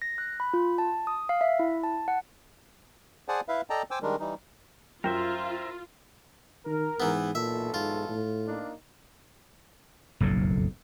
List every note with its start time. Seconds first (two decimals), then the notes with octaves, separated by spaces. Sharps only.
0.02 A#6
0.18 F#6
0.40 B5
0.54 F4
0.78 A5
1.07 D#6
1.29 F5
1.41 E5
1.59 E4
1.83 A5
2.08 F#5
3.28 G#4 C5 D5 F#5 G#5 A5
3.48 E4 B4 E5 F5
3.70 A4 D5 D#5 G5 A5 A#5
3.91 C5 G5 G#5 D6 E6
4.02 D#3 G3 G#3 D4 A#4
4.20 E3 G3 D#4
5.04 F#2 F4 A#4 C5 E5 G5
6.66 D#3 A#4
7.00 G#2 E3 B3
7.35 B1 A#2 E3 A4 E5
7.74 G#2 F4
8.09 A2
8.46 A#3 D4 D#4
10.20 F#1 B1 F2 A2